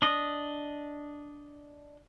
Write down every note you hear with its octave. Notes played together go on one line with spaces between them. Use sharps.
D4 D#5